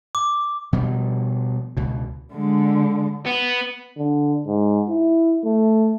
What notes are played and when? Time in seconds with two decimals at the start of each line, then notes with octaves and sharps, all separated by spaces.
0.15 D6
0.73 B2 F3 G3
1.77 C#2 B2
2.34 D3 G#3
3.26 B3
3.97 D3
4.46 G#2
4.88 E4
5.44 A3